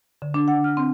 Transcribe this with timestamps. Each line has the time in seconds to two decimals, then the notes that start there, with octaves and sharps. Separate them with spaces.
0.22 D3
0.34 D4
0.48 F#5
0.64 F6
0.77 C4